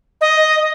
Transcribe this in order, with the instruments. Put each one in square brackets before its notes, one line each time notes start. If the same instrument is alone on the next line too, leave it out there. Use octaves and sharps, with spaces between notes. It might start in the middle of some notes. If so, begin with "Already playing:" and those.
[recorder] D#5